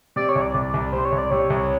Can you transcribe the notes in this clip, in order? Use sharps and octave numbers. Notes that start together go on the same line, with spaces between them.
C3 D5
C#5
C2
D5
C2
C2
C3 C5
C#5
C2
D5
C3 C#5
C2